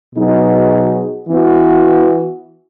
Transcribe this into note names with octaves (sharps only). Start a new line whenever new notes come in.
B2 F#3 B3 D#4 G#4
E3 B3 F#4